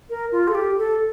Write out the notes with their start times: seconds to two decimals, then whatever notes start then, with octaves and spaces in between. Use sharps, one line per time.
0.10 A#4
0.32 F4
0.48 A4
0.55 G4
0.78 A4